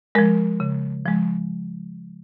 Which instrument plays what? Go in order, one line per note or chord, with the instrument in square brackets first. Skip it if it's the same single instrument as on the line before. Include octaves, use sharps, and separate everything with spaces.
[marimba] F3 G#3 A#4
C#3
F3 G#3